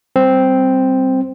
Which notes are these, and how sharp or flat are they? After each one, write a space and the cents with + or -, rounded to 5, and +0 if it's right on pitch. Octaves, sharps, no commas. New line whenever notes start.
G3 -15 C4 +0